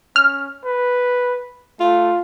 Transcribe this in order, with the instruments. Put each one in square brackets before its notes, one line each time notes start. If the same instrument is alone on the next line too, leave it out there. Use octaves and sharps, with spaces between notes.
[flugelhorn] C#4 [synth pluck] F6
[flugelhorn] B4
[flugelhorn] A3 [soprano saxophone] F4